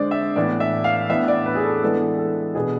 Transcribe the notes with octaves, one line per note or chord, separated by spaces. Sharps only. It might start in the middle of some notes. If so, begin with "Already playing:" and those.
Already playing: D3 G#3 D4 C5 D5
E5
A2 E3 B3 D5
E5
F5
A2 E3 B3 D4 E5
D5
B4
G#4
A4
E3 G#3 B3 D4 A4
A4
B2 B3 D4 G#4